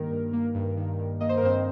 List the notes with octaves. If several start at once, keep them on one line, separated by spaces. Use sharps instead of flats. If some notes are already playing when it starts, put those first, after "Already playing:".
Already playing: G2 D#3 A#3 A#4
G2
A#3
G2
D#3
G2
A#3 D#5
C5
A#4
G2 C4 C5